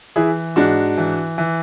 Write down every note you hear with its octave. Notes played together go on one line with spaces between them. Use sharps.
E3 E4 G#4
G#2 D4 F#4
E3
E3